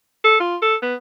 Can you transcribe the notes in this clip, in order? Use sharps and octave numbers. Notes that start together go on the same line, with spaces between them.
A4
F4
A4
B3